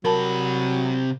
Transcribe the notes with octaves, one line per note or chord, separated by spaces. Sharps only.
C3 F#3 A#4 A5 B5